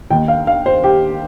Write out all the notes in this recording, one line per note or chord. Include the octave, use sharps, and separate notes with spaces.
D#2 D#3 G5
F5
F5
C5
G4